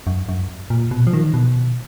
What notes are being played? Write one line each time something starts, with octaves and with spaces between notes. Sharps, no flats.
F#2
F#2
A#2
B2
F3
D#3
B2